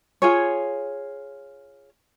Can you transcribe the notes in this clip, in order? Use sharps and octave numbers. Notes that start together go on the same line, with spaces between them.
F4 G#4 C#5